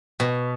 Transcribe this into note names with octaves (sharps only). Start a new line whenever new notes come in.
B2